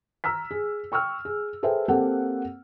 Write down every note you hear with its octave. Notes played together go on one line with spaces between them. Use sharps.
A#5 E6 F6 B6
G#4
G5 C#6 E6 F6
G#4
G#4 A4 B4 C5 E5 G5
A#3 C4 G4 A4 F#5